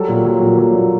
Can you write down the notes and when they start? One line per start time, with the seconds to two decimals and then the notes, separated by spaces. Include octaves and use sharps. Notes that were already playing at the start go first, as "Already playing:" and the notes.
Already playing: F#3 G3 A4
0.09 A#2
0.25 F#3
0.42 A#2
0.58 F#3
0.75 A#2